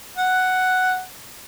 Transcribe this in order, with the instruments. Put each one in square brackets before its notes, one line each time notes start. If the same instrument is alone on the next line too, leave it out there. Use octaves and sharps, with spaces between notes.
[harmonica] F#5